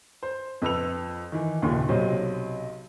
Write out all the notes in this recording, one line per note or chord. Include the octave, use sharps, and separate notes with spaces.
C5
F2 B4 E6 F7
D#3 E3
F#1 D#2 A#2
B1 C3 F#3 C5